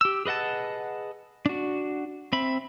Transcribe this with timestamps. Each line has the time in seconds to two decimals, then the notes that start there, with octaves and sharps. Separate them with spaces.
0.01 G4 E6
0.26 G#4 B4 D#5 F#5 A5
1.46 D4 F#4
2.33 C4 E5 B5